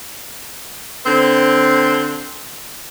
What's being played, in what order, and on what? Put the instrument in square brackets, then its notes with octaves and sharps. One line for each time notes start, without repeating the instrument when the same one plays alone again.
[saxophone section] D3 C4